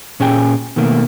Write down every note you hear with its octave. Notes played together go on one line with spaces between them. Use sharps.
A#2 C#4 G#4 G5 G#5
B2 D#3 A3 A#3